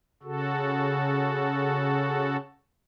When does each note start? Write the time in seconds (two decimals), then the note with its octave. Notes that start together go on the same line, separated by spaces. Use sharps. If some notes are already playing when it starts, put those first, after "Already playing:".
0.23 C#3 F#4 A4